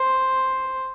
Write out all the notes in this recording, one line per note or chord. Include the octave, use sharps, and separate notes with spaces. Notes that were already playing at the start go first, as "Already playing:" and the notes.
Already playing: C5